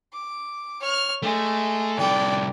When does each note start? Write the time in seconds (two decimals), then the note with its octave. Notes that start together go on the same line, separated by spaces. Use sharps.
0.14 D6
0.80 C#5 F6
1.23 G#3 A3
1.98 C2 A4 D5 G5